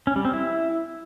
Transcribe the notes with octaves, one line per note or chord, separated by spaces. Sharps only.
C#4
G3
C4
E4